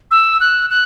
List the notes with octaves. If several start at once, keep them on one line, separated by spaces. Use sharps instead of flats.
E6
F#6
F#6